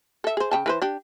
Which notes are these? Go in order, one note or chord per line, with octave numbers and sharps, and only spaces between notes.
A4 E5
G#4 C5
C#3 G5 A5
E3 B4 C5
D4 G4